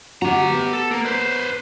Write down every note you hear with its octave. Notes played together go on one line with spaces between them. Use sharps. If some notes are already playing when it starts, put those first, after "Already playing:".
F#4 G4 A#5
B3
A4
A#3
B4 C5